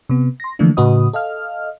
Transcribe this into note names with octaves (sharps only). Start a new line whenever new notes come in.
C3 B3
C6 A#6
D3 E3 F3 A3 A#3 D4
A2 C#3 F#4 B4 D#5 D#6
A4 D#5 F5 F6